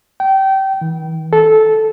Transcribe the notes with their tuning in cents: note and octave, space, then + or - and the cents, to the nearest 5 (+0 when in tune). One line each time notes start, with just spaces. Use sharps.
G5 -25
E3 -45
A4 -15